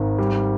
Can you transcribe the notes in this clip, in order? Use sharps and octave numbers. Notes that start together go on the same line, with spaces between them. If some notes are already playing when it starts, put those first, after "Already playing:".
Already playing: G#1 D#3
G3